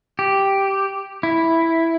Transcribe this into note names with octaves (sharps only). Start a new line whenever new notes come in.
G4
E4